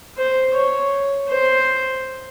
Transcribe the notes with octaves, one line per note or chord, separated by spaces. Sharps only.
C5
C#5
C5